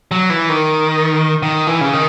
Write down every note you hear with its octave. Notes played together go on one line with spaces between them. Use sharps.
F#3
E3
D#3
D#3
E3
C#3
D#3